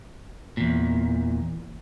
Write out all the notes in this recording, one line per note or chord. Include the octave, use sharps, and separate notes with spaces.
E2 A#2